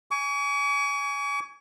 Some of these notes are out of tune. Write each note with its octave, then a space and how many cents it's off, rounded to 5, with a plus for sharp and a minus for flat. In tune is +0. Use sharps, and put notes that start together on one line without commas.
G#5 +0 C#6 +45